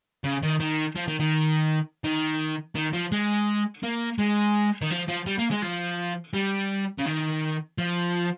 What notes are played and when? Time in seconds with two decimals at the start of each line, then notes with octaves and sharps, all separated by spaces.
0.24 C#3
0.43 D#3
0.60 D#3
0.96 F3
1.08 D#3
1.20 D#3
2.04 D#3
2.76 D#3
2.93 F3
3.12 G#3
3.83 A#3
4.19 G#3
4.82 D#3
4.91 F3
5.08 F3
5.27 G3
5.39 A#3
5.51 G#3
5.62 F3
6.34 G3
6.99 C#3
7.06 D#3
7.78 F3